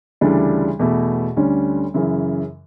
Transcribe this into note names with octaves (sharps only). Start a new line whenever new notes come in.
D2 C#3 E3 G3 D4
E2 B2 A3
D2 D3 G3 C#4
F#2 C#3 E3